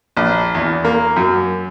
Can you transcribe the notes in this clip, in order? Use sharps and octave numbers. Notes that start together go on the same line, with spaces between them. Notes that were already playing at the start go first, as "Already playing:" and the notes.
A#1
E2
A#3
F#2